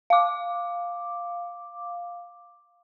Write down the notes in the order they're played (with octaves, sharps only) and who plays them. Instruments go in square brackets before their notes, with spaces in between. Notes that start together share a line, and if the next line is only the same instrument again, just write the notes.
[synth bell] F5 D6